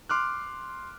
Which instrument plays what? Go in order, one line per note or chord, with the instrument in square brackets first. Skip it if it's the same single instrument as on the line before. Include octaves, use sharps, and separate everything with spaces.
[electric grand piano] C6 D6 F6 F#6